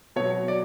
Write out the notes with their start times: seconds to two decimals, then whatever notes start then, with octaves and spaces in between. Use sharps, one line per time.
0.16 B2 F#3 C#5
0.48 D5